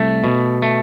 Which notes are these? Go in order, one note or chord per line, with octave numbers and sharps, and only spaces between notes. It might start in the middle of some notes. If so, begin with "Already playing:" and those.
Already playing: C2 A3
B2
A3